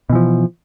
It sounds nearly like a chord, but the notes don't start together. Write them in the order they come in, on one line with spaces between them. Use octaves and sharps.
B2 E3 F3